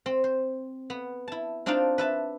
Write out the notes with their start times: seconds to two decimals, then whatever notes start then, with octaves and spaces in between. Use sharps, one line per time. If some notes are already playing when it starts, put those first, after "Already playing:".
0.06 C4
0.24 C5
0.90 B3
1.28 E4 A5
1.66 C4 D4 D#4 F4 D5 F5
1.98 B4 E5 A5